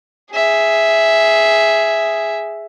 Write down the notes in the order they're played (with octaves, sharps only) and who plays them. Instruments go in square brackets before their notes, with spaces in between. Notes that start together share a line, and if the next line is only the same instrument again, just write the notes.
[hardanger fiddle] G#4 E5